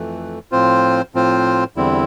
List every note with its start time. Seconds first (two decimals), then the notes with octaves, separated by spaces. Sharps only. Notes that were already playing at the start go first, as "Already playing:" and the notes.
Already playing: F2 E3 A3
0.51 A2 F3 C4 F4 C5
1.15 A2 F3 C4 F4 C5
1.76 E2 D3 G3 C4 E4